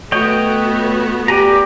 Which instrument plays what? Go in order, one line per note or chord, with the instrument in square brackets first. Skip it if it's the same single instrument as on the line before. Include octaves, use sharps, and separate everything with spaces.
[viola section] A3 B3 F#4 [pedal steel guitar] C#5 D#5 G5
[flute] G4 [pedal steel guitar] D5 G#5 A#5